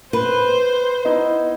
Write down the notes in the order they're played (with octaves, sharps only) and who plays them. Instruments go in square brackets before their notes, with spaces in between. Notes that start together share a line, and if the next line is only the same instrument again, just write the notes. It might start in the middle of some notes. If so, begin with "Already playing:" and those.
[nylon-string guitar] B4 [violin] C5
[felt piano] B3 D#4 E4